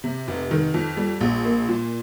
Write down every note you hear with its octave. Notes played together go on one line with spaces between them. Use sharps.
C3
F1
D#3
F2
G3
A#1
A#3
A#2